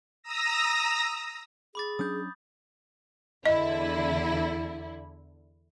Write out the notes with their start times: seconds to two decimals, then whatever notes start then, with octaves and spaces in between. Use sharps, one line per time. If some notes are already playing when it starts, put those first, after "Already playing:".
0.23 A#5 D#6 E6 A#6
1.75 G#4 B5 D6 A6
1.99 F#3 C#4 D4 D#6 G6
3.46 E2 D3 E4 D#5